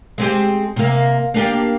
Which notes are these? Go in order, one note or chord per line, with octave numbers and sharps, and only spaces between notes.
G#3 C4 G4
C3 A#3
A#3 D4 G4